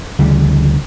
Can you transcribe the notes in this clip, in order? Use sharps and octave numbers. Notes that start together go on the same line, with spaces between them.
D2 C#3 E3 G3